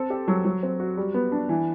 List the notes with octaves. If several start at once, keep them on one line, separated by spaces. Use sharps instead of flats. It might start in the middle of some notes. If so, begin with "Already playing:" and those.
Already playing: C4 A4
G4
F#3
F#3
C4
F#4
G3
B3
D4
E3